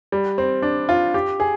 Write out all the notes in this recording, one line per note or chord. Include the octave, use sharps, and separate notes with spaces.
G3
C4
D4
F4
G4
G#4